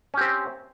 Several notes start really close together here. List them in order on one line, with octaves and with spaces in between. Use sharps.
C#4 G4 C4